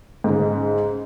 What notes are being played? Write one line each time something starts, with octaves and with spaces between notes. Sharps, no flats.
G#2 C#3